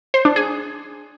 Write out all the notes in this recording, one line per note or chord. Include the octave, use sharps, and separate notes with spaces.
C5
D4
G#4